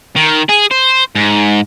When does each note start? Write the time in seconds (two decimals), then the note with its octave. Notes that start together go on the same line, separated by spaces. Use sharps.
0.16 D#3
0.49 G#4
0.71 C5
1.15 G#2